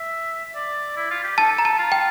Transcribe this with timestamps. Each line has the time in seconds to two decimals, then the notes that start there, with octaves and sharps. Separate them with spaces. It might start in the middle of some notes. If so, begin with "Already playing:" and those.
Already playing: E5
0.55 D5
0.97 E4
1.11 F4
1.24 G4
1.37 A4 A5
1.58 A#5
1.65 A5
1.78 F4
1.92 G5